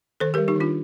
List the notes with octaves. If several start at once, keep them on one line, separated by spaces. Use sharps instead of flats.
D#3 A4 C5
G3 G4 A#4
D#4 G4
D#3 D4 F4